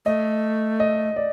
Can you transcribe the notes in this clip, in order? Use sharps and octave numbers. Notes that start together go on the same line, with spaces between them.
A3 D#5
D#5
D5